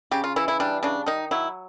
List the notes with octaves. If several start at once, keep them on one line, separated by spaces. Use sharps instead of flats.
C#3 G4
F4
E3 E4
E4
G3 D4
C#3 D4
D#3 D#4
F#3 E4